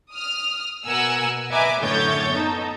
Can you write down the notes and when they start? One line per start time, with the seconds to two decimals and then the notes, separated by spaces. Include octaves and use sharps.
0.12 D#6 F6
0.85 B2 A#4 F#5 G#5 E6
1.51 B4 D#5 E5 G#5 A#5 D6
1.81 F#2 A2 D3 C#5 G6 A6
2.32 B3 D#4 A4